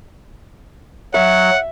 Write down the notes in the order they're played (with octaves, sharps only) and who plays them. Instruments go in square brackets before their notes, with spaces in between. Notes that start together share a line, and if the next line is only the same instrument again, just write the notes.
[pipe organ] F#3 [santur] E5 [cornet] F#5